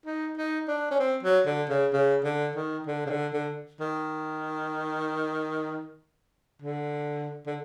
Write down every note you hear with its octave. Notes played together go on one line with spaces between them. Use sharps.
D#4
D#4
D4
C#4
C4
F#3
D3
C#3
C#3
D3
D#3
D3
C#3
D3
D3
D#3
D3
D3